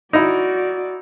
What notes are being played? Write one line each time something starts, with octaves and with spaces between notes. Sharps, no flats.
D#4 E4 F#4 D5